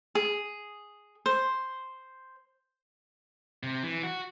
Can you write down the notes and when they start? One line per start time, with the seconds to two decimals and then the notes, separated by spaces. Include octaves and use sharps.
0.15 G#4
1.26 C5
3.63 C3
3.84 E3
4.03 F#4